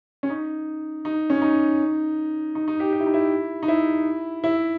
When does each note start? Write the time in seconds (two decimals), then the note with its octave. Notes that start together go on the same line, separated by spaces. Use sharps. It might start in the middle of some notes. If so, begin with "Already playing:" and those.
0.23 C#4
0.30 D#4
1.05 D#4
1.30 C#4
1.42 D#4
2.55 D#4
2.68 D#4
2.80 G4
2.93 G4
3.00 E4
3.07 D#4
3.14 E4
3.63 D#4
3.68 E4
4.44 E4